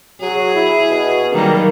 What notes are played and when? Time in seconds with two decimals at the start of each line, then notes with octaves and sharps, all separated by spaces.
0.21 F#3 G#4
0.55 E4
0.90 B2
1.33 D#3 F#3 G3 A#3